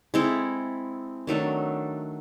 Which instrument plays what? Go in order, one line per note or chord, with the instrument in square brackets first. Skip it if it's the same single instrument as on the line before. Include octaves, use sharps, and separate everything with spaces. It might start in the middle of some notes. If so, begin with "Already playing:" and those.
[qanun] G#3 C4 E4 A4
D#3 F#3 A3 D4